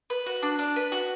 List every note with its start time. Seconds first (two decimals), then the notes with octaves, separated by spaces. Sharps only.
0.10 B4
0.26 F#4
0.42 D4
0.59 D4
0.76 B4
0.92 F#4